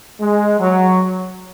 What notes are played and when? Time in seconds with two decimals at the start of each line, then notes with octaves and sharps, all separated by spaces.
0.20 G#3
0.59 F#3